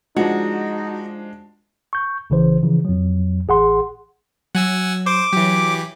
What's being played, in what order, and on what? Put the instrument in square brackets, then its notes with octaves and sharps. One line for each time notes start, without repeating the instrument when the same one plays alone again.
[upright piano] F3 [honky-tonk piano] G#3 D4 [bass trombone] D#4 [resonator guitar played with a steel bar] F#4
[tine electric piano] C#6 G6
A#1 C#3 E3 C5
C#3 E3 F3
F2 F#3
A1 G#4 F#5 C6
[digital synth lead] F#3 [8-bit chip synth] F#5 G#5 E6
[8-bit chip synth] C5 [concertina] D6
[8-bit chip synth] E3 G4 [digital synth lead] F#3